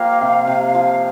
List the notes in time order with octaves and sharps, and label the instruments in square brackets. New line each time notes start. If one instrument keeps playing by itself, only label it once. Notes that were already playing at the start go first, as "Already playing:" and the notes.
Already playing: [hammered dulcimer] F3 A#3 G4 [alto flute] F5
[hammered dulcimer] C3
C3
F3